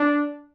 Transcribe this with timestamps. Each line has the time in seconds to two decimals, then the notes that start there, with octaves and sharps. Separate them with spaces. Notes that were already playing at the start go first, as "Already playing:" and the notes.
Already playing: D4